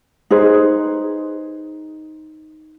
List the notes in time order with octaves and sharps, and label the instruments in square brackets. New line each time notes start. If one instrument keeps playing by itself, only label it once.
[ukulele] D#4 G#4 B4 C5